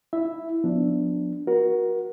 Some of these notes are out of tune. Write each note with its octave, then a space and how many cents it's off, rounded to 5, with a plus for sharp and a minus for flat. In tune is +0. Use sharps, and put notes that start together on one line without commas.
E4 +0 E5 +0
F3 +30 B3 +0 D4 +0
F#4 +0 A#4 +30